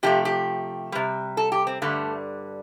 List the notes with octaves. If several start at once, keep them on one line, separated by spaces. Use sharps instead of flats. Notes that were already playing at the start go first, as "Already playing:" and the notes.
C3 F3 A3 G4
G4
C3 G3
A4
G4
C4
G2 D3 G3 A3